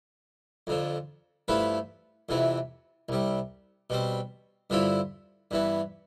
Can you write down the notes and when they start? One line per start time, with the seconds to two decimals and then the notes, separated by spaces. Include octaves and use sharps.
0.67 F2 D3 F3
1.48 G2 F3 A3 E4 B4
2.29 F2 C3 E3 B3
3.09 C2 C3 G3
3.90 B2 G3 C4
4.70 G2 D3 F3 C4 E4
5.51 G2 E3 B3